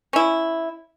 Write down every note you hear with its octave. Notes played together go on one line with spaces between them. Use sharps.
C#4 E4